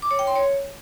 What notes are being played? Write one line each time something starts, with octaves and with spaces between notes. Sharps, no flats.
D6
C#5
G5
C6
C#5